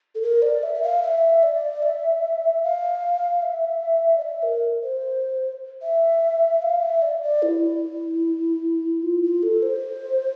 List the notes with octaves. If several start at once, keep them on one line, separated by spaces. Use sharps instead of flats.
A4
A#4
D5
E5
E5
F5
E5
D5
E5
F5
E5
D5
E5
A#4
C5
E5
F5
E5
D5
D5
E4
F4
F4
A4
C5